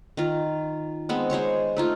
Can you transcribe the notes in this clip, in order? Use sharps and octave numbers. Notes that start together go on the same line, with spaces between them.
D#3 F4
G#3 B3 C4
G#3 C5 C#5 C#6
A3 D#4 F4